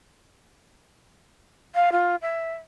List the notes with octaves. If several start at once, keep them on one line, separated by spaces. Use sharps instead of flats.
F5
F4
E5